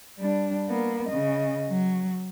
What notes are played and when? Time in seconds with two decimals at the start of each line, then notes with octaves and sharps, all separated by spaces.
0.18 G3 D4
0.68 A#3 B3
1.09 C#3 D#5
1.69 F#3